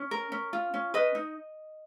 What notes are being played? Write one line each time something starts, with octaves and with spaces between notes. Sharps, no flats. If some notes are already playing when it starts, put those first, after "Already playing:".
Already playing: C#4
A#4
C#4
F4
C#4
B4 D#5
D#4